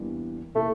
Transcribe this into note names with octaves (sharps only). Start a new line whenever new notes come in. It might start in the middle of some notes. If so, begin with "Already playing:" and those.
Already playing: E2 E3 G3 A#3 D4
C3 E3 A3 A#3 E4